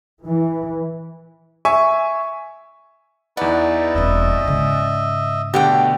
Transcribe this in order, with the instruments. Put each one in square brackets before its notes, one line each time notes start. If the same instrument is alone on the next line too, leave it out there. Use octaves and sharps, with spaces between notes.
[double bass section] E3
[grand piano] E5 G#5 C#6
[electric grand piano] E2 F#5 [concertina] D#4 E4 B4 [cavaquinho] D5
[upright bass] E1 F2 [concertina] D#5 E5
[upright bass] G#2 C#3
[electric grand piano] B2 D3 A3 [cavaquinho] G4 F#5 G5